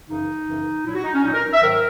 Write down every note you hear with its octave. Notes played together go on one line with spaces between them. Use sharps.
F#2 C#3 E3 D#4
F#2 C#3 E3
A#2 F#3 E4
F#4
D#4
C#4
A#2 F#3 D#4
A#4
E5
G#2 D#3 F#3 A#4